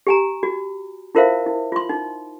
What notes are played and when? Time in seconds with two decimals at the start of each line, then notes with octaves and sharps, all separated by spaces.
0.07 G4 G#5 A#5
0.43 F#4
1.15 E4 F4 A#4 C5 E5 F5
1.46 E4
1.72 F4 C6
1.89 D#4